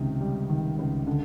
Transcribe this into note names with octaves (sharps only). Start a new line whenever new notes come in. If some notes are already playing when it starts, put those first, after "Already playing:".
Already playing: C#2 C3 D#3
G3
D#3
C#2
D3